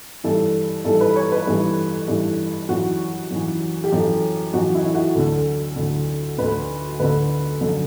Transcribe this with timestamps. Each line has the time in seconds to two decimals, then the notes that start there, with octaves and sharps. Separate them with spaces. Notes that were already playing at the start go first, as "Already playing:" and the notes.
0.24 G2 E3 A4
0.85 G2 E3 A4
1.01 B4
1.16 C#5
1.32 B4
1.47 G2 E3
2.08 G2 E3
2.69 F#2 E3 F#4
3.31 F#2 E3
3.84 G4
3.92 F#2 E3 A4
4.54 F#2 E3 F#4
4.75 E4
4.86 E4
4.95 F#4
5.15 D2 D3 A4
5.76 D2 D3
6.38 D2 D3 B4
7.00 D2 D3 B4
7.61 F#2 D3